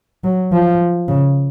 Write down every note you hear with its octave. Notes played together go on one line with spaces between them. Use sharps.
F#3
F3
C#3